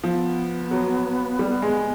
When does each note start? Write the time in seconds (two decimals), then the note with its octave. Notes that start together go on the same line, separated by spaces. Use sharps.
0.04 F3 B3
0.71 F#3
1.39 G3
1.62 G#3